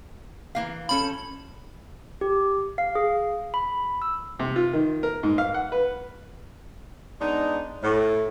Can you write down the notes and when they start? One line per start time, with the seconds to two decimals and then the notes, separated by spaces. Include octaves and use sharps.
0.55 E3 A#3 F5
0.89 F3 C#4 A4 B5
2.21 G4
2.78 F5
2.95 G#4
3.54 B5
4.02 E6
4.39 C3
4.56 F4
4.73 D#3
5.03 A#4
5.23 G#2
5.38 F5
5.54 F#5
5.72 B4
7.21 G#3 B3 D4 D#4
7.83 A2